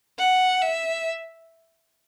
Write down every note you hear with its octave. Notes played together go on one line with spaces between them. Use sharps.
F#5
E5